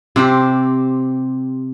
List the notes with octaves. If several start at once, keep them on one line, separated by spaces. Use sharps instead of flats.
C3 C4 G4